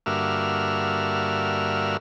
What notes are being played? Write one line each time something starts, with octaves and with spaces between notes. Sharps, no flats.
G2 D3 A#3 F#4 E5 F6